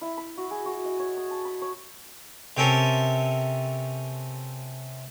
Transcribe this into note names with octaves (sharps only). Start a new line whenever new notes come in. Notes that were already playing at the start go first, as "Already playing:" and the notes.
E4
B5
F#4
G#4
F#4
D#5
C#5
D#6
A5
B5
C#5
C3 C4 C#4 A4 A#4